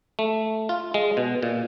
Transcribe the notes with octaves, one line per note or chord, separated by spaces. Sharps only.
A3
F4
G#3
B2
A#2